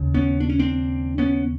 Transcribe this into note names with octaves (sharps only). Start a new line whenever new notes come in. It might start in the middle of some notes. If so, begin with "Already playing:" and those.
Already playing: D#2 C#3
B3 C#4
D4
C#4
C4 D4
B3 C#4